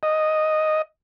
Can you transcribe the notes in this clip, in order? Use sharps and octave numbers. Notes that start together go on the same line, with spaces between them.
D#5